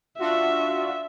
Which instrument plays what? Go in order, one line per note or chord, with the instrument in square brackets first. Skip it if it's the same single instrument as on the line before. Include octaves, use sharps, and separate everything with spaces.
[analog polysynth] D4 F4 F#4 [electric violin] E5